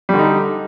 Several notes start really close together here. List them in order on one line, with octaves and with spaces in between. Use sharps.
G3 D3 D#4